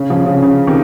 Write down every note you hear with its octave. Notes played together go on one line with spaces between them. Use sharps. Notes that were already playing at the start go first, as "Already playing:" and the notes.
Already playing: C#3
C#3 F3
C#3
C#3
C3 D#3